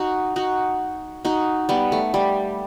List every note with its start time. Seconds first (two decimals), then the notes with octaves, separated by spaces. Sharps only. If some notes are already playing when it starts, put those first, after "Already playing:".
Already playing: D#4 F#4
0.36 D#4 F#4
1.25 D#4 F#4
1.69 G3 B3
1.92 A3
2.14 G3